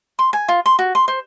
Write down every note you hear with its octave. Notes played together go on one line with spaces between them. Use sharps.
C6
G#5
F4
C6
F#4
C6
C5